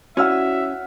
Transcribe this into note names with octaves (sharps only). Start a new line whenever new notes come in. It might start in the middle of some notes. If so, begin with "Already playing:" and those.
C#4 E4 F#4 D5 E5 F#5 E6 F6